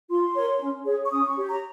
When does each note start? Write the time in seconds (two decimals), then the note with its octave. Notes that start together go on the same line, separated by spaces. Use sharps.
0.09 F4 C6
0.35 A#4 C#5
0.60 C#4
0.85 G#4 C#5
1.04 C#6
1.11 C#4 D#6
1.23 C#6
1.36 G4 C#5
1.49 A#5